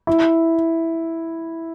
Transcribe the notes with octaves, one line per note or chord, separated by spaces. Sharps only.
E4